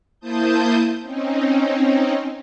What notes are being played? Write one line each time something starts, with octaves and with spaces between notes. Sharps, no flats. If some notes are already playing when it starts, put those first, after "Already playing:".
A#3 E4 C5 A5 D#6 G6
C4 C#4 D#4